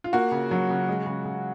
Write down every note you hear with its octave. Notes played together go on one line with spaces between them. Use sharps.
F4
A#3 F#4
C#3
F#3
C#3
G#3
C#3
C#3